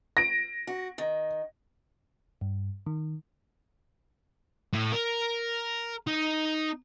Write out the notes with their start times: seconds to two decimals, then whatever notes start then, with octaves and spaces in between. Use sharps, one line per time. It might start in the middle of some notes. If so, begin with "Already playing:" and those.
0.17 A#6 D7
0.67 F#4
0.98 D#3
2.41 G2
2.86 D#3
4.73 A2
4.92 A#4
6.07 D#4